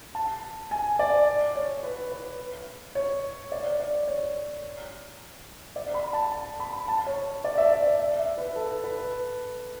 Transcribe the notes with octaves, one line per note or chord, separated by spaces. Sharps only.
A5
G#5
D5
C#5
B4
B4
C#5
D5
D5
C#5
D5
B5
A5
A5
B5
A5
C#5
D5
E5
D5
E5
E5
B4
A4
B4